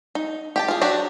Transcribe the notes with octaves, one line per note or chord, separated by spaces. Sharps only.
D#4
G4 G5 A5
F4 G#4
F#3 D4 F#4 G4